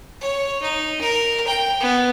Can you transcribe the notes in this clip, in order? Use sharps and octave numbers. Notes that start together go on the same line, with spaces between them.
C#5
D#4
A#4
G5
B3